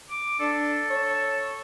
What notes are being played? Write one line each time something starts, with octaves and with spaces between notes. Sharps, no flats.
D6
D4 A4
C#5